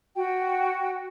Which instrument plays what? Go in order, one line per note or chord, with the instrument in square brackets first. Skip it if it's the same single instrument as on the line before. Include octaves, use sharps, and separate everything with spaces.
[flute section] F#4 G5